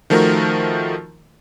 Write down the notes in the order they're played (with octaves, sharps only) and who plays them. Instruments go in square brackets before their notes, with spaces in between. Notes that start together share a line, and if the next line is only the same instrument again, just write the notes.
[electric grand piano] D#3 F3 A3 F#4 A#4